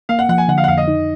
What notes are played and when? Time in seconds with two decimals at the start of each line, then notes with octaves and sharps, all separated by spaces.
0.09 A#3 F5
0.19 F#5
0.29 F3 F#5
0.38 G#5
0.48 D3 F#5
0.58 F5
0.64 F#5
0.68 F2 F5
0.78 D#5
0.88 D#4